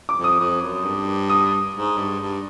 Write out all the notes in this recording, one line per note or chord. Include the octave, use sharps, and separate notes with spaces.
D6
F2
D#6
F2
F#2
G2
D#6
G#2
G2
G2